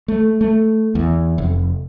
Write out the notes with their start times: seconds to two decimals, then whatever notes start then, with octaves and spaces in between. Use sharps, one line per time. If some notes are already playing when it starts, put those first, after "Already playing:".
0.08 A3
0.41 A3
0.95 E2
1.38 F1